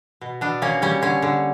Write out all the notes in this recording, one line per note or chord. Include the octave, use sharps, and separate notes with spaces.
B2
B2 D4
A#3 C#4
G3 C#4
D3 C#4
D3